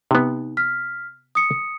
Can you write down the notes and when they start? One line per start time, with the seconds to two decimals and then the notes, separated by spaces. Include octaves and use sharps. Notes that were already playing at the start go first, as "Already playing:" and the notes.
0.11 C3 B3 D#4
0.57 F6 B6
1.35 D#6 C#7